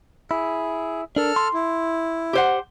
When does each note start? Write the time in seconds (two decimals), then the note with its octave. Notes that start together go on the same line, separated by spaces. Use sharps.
0.31 E4 G#4
1.16 D4 A4 A#4 F6
1.36 C6
1.54 E4
2.33 G4 C5 F#5